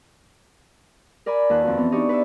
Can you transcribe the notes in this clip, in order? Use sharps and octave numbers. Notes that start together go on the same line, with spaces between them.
A#4 D5 G#5 B5
D#2 F4 B4 A5 F#6
F2 F#4
E3 B3 C4
D4 D#4 G4 D5 C#6
B4 C#5 D5 E5